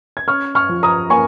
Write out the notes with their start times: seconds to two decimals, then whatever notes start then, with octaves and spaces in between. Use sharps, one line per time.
0.17 G#6
0.28 C#4 C#6 F6
0.55 C#6 F6
0.69 F3
0.83 A#5 D#6
1.10 A#3 G#5 C#6